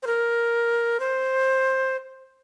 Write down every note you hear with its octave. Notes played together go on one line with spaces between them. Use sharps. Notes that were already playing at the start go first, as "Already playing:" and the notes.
C5
A#4
C5